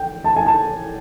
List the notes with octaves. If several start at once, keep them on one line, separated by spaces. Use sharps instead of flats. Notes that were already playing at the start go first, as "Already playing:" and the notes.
Already playing: G5
A5
G#5
A5